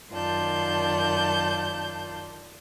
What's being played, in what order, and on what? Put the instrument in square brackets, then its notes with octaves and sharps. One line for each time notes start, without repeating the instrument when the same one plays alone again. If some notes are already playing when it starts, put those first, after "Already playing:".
[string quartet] F#2 D#3 F4 D5 A5 G6